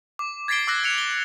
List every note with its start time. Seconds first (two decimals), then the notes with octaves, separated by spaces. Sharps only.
0.19 D6
0.48 G#6 A6 B6 C7 D7 G7
0.67 D6 E6 F#6 A#6
0.84 F#6 C#7 F7
0.98 G7